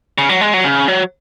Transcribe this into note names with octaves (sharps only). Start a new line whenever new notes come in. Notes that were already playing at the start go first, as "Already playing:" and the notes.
C#3
F#3
G#3
F#3
C#3
F#3